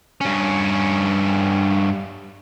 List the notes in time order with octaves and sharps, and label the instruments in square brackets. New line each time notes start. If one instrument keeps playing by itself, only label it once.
[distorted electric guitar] G2 C#4